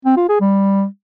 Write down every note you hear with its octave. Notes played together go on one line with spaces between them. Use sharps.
C4
F4
G#4
G3